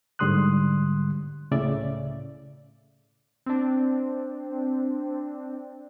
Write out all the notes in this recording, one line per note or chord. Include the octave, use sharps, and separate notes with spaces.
G#2 D3 G3 C6 D#6 F#6
C#2 A2 C#3 D5 E5
C4 D4